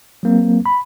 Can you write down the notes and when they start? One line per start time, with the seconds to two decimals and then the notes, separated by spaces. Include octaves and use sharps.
0.23 F#3 A#3 C4
0.66 B5